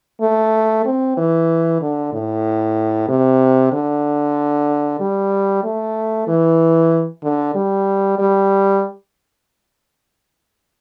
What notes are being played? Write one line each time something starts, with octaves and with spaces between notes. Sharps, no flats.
A3
C4
E3
D3
A2
C3
D3
G3
A3
E3
D3
G3
G3